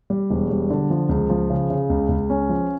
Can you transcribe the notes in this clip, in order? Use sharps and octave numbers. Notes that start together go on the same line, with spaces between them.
G3
E1
G3
D3
F3
C#2
F3
C#3
C#3
C#2
C#2
C#4
F3